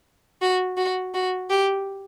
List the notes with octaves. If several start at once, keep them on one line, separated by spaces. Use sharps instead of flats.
F#4
F#4
F#4
G4